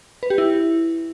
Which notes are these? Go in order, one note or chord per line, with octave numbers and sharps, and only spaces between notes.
B4
G4
E4